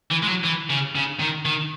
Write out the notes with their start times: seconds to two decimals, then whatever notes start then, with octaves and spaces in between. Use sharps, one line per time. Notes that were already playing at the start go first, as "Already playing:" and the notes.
0.11 E3
0.22 G#3
0.27 F#3
0.44 E3
0.70 C#3
0.95 C#3
1.20 D#3
1.46 D#3